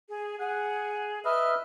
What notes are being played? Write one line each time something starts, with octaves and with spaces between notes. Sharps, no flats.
G#4
G#4 F#5
B4 D#5 E5 F6